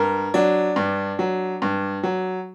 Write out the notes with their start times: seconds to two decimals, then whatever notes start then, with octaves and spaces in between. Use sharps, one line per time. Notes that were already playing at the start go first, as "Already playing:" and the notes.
Already playing: G2 A#4
0.34 F#3 D4
0.76 G2
1.19 F#3
1.62 G2
2.03 F#3